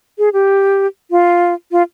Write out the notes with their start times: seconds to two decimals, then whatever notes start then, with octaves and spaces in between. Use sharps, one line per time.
0.18 G#4
0.33 G4
1.11 F4
1.72 F4